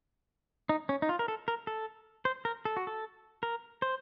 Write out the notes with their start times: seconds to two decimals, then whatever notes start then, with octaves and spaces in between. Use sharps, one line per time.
0.69 D#4
0.89 C#4
1.02 D#4
1.09 F4
1.19 A#4
1.28 A4
1.48 A#4
1.67 A4
2.25 C5
2.45 A#4
2.65 A4
2.77 F#4
2.87 A4
3.43 A#4
3.82 C5